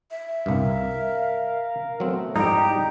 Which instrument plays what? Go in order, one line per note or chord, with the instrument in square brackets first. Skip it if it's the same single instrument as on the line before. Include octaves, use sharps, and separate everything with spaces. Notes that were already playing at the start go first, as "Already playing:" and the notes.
[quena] E5
[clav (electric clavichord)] C2 G2 [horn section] A#4 F5
[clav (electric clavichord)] F#3 C4 [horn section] A3 B3
[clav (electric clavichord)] G#2 F3 E4 [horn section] G3 [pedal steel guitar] D#4 G4 [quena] A#5